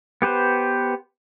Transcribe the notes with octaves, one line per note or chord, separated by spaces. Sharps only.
B3 G4 B4 C5